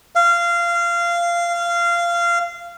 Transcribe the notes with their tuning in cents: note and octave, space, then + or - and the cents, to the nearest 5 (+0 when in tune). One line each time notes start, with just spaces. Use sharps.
F5 -20